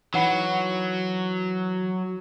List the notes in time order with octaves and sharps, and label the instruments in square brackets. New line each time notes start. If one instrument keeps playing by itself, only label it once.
[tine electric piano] E3 [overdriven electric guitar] F#3 [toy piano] D#4 F#5 B5